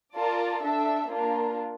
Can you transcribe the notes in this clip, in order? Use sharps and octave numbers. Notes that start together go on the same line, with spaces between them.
F4 A#4 D5 A5
D4 A4 E5
A#3 D4 F4 A#4